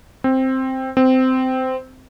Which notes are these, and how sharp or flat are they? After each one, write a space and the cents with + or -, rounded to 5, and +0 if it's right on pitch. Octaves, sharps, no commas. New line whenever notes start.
C4 +5
C4 -15